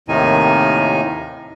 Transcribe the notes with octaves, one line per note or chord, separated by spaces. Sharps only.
D#2 A2 C3 D#3 D#4 G#5